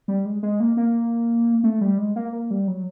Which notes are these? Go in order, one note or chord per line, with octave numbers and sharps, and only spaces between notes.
G3
G#3
G#3
A#3
A#3
A3
G3
G#3
A#3
A#3
G3
F#3